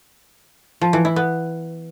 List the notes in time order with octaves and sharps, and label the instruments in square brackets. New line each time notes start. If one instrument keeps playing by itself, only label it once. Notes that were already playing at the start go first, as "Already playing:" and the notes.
[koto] F3
E3
E4
B3